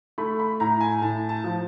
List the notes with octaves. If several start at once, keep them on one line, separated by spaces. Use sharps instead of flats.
A3 B5
B5
A2 A#5
G#5
A2 A5
A5
F3